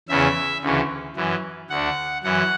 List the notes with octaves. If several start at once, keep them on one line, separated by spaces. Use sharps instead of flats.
E2 C#3 E3 E5
D2 C#3 E3
F#2 E3
D2 D3 F#5
F#2 E3 F#5